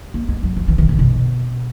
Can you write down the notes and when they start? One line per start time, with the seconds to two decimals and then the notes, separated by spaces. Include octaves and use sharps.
0.14 A#3
0.28 G#3
0.43 F#3
0.57 F3
0.68 E3
0.78 D#3
0.89 D3
0.99 B2